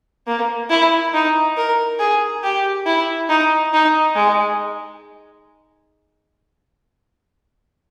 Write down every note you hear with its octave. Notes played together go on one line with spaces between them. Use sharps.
A#3
E4
D#4
A#4
G#4
G4
E4
D#4
D#4
G#3